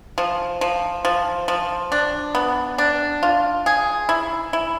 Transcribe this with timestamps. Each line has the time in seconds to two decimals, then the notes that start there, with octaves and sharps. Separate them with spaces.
0.18 F3
0.61 F3
1.05 F3
1.48 F3
1.92 D4
2.35 B3
2.78 D4
3.23 F4
3.66 G#4
4.09 E4
4.53 E4